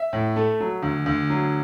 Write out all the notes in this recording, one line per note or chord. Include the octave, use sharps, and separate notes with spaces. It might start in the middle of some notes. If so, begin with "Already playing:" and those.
Already playing: E5
A2
A3
F#3
D2
D2
F#3